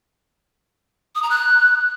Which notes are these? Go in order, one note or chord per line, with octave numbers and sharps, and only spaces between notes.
D#6
A#5
F#6